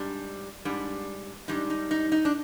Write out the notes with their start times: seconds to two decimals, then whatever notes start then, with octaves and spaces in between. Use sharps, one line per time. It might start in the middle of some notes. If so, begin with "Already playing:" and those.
Already playing: G#2 G3 D4
0.65 G#2 G3 D4
1.48 G#2 G3 D4 D#4
1.70 D#4
1.91 D#4
2.12 D#4
2.25 D4